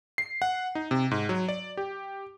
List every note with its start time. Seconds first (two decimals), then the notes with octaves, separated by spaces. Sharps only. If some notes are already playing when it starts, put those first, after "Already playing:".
0.18 C7
0.42 F#5
0.75 D#4
0.91 C3
1.11 G#2
1.29 F#3
1.49 D5
1.77 G4